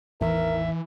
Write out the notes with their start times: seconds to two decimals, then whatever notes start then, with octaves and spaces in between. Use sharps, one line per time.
0.21 A1 E2 D#3 E3 A#4 E5